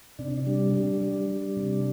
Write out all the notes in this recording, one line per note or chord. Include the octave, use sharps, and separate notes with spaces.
C3 D4
D4
G3
G3
G3
G3
C3